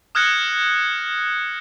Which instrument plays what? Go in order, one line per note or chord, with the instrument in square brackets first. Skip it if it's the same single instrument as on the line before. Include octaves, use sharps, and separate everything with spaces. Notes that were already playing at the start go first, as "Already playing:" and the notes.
[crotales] D#6 F6 F#6 G#6 A#6 C#7